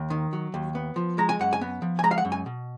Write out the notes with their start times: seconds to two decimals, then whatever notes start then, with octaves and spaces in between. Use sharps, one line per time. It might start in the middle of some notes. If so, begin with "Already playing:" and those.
Already playing: D#2
0.10 D#3
0.33 F#3
0.54 D#2
0.75 B3
0.96 F3
1.18 G#3 A#5
1.29 G#5
1.39 F#2 F#5
1.53 G#5
1.61 B3
1.82 F3
1.99 G#5
2.03 G#3 A#5
2.11 F5
2.18 F#5
2.25 F#2
2.32 G#5
2.46 B2